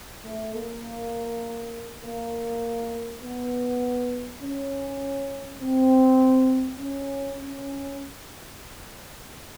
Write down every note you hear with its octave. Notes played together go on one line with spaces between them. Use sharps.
A3
A#3
A#3
B3
C#4
C4
C#4
C#4